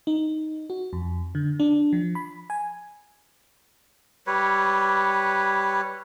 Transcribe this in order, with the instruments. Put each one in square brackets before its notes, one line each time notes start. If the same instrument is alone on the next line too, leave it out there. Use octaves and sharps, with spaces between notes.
[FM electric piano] D#4
F#4
F2
D3
D4
F3
B5
G#5
[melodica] G3 B4 C#5